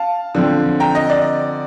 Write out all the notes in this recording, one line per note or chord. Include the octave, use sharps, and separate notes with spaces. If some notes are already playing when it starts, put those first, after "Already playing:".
Already playing: F5 A5
D3 F3 C4
G5 A#5
D#5
D5